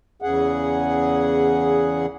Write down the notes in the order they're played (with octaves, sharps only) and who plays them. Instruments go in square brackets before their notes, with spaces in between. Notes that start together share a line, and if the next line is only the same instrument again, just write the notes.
[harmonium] E2 C#3 G#4 F#5